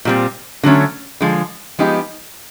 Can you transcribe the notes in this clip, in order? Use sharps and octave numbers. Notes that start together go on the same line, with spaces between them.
A#2 G3 C4
D3 F#3 A3 C#4
D3 F3 G#3
F3 G#3 B3 D#4 G4